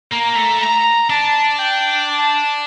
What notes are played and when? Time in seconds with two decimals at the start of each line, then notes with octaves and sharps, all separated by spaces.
0.12 A#3 A#5
0.36 A3
0.61 A#5
1.10 D4 A5
1.59 G5
2.08 A5